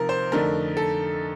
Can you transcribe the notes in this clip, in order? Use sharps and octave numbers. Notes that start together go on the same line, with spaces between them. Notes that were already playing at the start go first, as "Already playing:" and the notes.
Already playing: C3 F3 D#4 A#4
C5
F2 D3 A3 D#4 A#4
A4